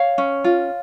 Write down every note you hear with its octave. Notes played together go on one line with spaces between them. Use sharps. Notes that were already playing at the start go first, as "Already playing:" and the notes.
Already playing: C#5 F5
C#4
F4